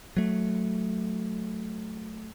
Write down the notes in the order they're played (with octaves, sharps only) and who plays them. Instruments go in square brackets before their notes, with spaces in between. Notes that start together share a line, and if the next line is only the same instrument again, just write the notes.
[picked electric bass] F#3 A3